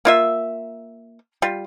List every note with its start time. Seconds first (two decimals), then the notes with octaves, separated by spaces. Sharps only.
0.05 A#3 F4 E5
1.42 G3 F4